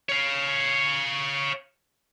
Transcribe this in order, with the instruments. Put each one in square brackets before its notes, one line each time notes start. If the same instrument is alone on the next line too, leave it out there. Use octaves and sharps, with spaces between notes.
[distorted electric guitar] C#5 F5